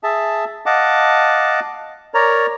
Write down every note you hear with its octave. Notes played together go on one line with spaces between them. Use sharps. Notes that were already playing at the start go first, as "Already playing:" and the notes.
G#4 E5 A5
D#5 F5 F#5 A5 D6
A#4 C#5 D5 A#5